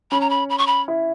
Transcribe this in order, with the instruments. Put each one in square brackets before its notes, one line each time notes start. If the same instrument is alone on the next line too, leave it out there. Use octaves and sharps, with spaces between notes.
[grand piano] C#4 [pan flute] B5
[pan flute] A#5
B5
B5
C#6
B5
[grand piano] E4